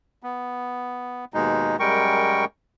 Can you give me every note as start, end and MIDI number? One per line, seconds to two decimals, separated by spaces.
0.23 1.25 59
1.34 1.76 39
1.34 1.76 47
1.34 1.76 56
1.34 1.76 63
1.80 2.45 42
1.80 2.45 55
1.80 2.45 56
1.80 2.45 70
1.80 2.45 79
1.80 2.45 85